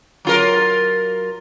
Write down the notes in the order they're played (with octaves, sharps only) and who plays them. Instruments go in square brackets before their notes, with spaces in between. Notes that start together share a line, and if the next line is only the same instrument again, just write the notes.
[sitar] F#3 F4 A#4